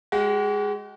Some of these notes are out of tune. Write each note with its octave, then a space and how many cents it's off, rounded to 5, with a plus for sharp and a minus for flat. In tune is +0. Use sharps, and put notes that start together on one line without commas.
G#3 -5 F#4 +45